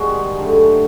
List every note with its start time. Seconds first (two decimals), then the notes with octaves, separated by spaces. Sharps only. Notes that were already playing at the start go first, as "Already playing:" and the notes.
Already playing: G#2 D#3 G3 C4 F#4 G#4
0.38 D3 F#3 A3